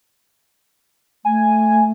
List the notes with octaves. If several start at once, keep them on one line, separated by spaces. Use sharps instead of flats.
A3 G#5